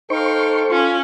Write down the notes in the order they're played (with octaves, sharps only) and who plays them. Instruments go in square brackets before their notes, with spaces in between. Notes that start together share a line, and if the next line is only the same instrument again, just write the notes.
[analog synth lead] D#4 [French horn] A4 [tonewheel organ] C5 C#6 [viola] F5 G5
[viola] C#4 [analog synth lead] F4